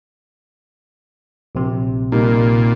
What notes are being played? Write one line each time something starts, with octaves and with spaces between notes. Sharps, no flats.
A#1 C3
A#2 G3 D#4 A#4